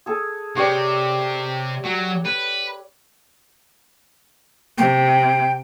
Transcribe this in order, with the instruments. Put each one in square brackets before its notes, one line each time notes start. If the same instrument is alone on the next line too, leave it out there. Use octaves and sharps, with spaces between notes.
[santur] G#4 A4
[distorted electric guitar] C3 [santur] G4 C#5 D5
[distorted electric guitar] F#3
B4
[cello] C3 [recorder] G5